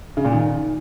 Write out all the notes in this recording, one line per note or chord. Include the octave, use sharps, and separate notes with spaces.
C#3
A#2
D#3